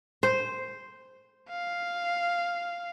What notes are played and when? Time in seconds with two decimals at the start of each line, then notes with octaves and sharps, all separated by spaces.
0.23 C5
1.50 F5